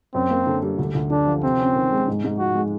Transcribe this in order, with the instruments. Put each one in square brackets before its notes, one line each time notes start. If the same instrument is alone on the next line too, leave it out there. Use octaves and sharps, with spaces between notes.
[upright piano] F#2 [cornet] C4
[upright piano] A#3
D3
G3
D2
D2
[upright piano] D3 [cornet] D4
[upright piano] F3
[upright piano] C3 [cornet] C4
[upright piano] C#4
D#3
G#3
G#2
G#2
[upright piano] F3 [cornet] F#4
[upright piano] G#3